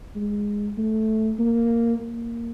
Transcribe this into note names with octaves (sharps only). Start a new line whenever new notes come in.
G#3
A3
A#3
A#3